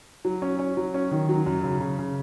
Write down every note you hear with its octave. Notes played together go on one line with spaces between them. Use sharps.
F#3
C#4
C#4
F#3
C#4
D#3
F#3
F#2
C#3
C#3
C#3